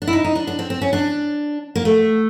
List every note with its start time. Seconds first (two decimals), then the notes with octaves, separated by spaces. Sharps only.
0.02 D4
0.08 E4
0.13 D#4
0.24 D#4
0.35 D4
0.47 D4
0.59 C4
0.70 C4
0.81 C#4
0.93 D4
1.75 A#3
1.85 A3